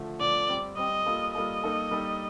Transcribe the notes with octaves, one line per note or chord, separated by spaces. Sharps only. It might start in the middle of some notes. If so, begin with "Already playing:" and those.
Already playing: D3 F3 A3
D3 F3 A3 D5
G3 C4 G4
G3 C4 G4 D#5
G3 A#3 F4 A4
G3 A#3 F4 A4 D#5
G3 A#3 D#4 A4
G3 A#3 D#4 A4